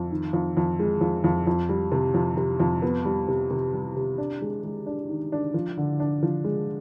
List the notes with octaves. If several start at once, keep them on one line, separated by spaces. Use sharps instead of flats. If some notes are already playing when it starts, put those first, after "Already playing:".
Already playing: F2
D#3
F2
F2
G#3
F2
F2
F2
G3
C3
F2
C3
F2
B3
G3
C3
C3
G3
C3
D4
G#3
G#3
D4
D#3
D4
F3
D3
D4
F3
G#3